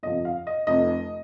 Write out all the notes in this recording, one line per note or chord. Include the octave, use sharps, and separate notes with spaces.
G1 F2 C3 F3 D#5
F5
D#5
F1 F2 C3 D#5